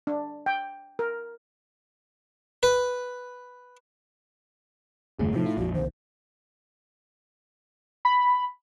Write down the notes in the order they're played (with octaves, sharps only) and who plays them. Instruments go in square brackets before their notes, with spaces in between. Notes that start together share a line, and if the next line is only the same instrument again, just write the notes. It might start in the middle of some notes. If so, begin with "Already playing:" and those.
[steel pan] D4
G5
A#4
[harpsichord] B4
[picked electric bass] F1 G2 A3 [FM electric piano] E2 D3 G#4
[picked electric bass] A2 [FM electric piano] C3 F3 [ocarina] D#4
[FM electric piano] E4 F4
[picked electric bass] A#1 F2 [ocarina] F#4
[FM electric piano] C2 D#3 [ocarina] C5
[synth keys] B5